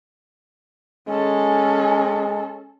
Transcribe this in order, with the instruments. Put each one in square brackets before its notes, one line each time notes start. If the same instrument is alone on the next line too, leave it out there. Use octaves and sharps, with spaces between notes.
[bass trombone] G#3 [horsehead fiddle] C#4 A4